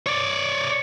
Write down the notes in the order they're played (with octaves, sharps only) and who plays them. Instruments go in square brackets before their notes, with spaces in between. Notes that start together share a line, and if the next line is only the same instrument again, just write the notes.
[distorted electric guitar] C#5 D5